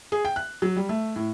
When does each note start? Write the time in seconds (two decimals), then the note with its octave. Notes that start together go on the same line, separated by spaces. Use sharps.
0.12 G#4
0.25 G5
0.36 F#6
0.62 F#3
0.76 G3
0.89 A3
1.16 A2